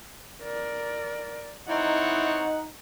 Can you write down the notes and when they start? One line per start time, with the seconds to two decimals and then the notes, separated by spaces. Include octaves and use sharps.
0.43 A#4 D5
1.69 C4 D#4 E4 C#5 F#5